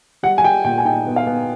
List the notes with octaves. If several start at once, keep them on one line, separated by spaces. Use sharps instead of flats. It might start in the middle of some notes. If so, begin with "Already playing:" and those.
G3 F#5
G#5
G3 G5
A#2 G5
G#5
D#4 G5
B3
F5
B3